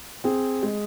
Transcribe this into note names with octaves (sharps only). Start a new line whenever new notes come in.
C4 G#4
G#3